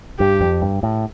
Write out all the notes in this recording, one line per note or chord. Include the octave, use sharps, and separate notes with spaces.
G2 G4
F2
G2
A2